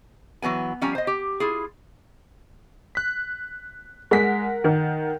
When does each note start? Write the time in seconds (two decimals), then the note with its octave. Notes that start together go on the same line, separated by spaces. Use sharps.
0.42 E3 F#3 B3 G#5
0.81 F3 G3 C#4 G#5 A#5
0.95 C5 D#5
1.07 G4
1.40 E4 F4 G#4
2.95 F#6 B6
4.11 G#3 A#4 F#5 B6
4.64 D#3